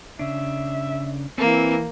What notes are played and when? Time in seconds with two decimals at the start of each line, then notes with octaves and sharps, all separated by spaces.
0.19 C#3 D4 E5
1.38 E3 A#3 C4